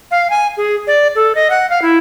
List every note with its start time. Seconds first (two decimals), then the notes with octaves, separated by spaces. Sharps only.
0.11 F5
0.30 G#5
0.57 G#4
0.87 D5
1.15 A4
1.35 D#5
1.50 F#5
1.70 F5
1.82 E4